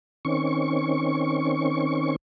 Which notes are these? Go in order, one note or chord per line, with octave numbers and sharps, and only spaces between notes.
D#3 C4 C#4 C#6